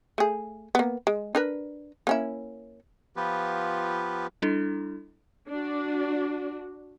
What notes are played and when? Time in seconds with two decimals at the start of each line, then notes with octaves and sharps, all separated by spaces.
0.18 A3 G#4
0.75 A#3 B3
1.07 G#3
1.35 D4 A#4 B4
2.07 A#3 C#4 E4
3.16 F3 B3 F4 G4 B4
4.42 G3 D4 E4 A4
5.49 D4 F#4